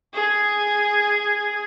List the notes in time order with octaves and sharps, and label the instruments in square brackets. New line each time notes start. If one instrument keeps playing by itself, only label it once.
[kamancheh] G#4 G#5